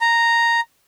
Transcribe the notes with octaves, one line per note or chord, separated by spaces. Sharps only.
A#5